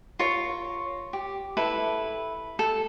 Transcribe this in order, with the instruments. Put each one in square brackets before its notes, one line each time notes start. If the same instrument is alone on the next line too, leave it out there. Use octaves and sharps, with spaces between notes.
[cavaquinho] F4 A#4 C#5 C#6
G4
E4 A4 B4
A4